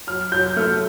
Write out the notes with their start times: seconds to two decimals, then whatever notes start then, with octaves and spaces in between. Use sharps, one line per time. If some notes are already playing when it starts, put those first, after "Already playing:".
0.07 F#3 F6
0.32 F#3 G6
0.56 A3 F6